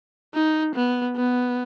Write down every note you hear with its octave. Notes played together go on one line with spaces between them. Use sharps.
D#4
B3
B3